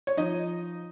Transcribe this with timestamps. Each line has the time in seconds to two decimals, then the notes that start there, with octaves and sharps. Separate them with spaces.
0.07 C#5
0.17 F3 D#4 D#5